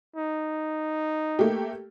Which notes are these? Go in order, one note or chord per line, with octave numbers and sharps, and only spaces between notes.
D#4
A3 A#3 G4